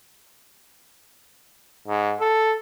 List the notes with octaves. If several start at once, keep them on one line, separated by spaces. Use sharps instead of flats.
G#2
A4